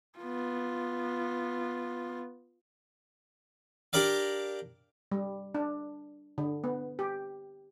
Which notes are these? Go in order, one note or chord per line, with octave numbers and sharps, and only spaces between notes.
B3 F4
D4 G4 A#4 D5 F5
G3
D4
D3
B3
G4